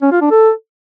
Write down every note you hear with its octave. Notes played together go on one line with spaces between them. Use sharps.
C#4
F4
D4
A4